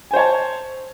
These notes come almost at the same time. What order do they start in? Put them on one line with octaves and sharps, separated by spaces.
G#5 C5 C#5 A5